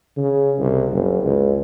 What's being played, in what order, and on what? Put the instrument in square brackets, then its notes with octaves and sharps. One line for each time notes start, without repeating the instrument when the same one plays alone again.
[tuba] C#3
C2
F#1
C#2